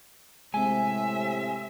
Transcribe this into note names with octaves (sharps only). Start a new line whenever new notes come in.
A2 C3 G#3 C4 E5 G#5